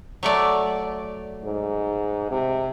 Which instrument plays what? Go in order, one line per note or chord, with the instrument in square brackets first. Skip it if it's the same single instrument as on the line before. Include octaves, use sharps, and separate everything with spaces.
[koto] F#3 A3 D5
[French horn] G#2
C3